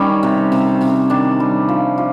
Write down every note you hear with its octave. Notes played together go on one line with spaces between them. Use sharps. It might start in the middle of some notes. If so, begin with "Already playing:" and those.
Already playing: D#3 G3 C#4
C3
C3
C3
D#3 D4
G3
F3
F3